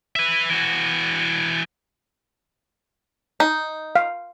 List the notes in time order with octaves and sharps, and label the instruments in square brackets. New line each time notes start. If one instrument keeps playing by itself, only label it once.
[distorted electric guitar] B4 E5
E3 F#4
[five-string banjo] D#4
[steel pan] F5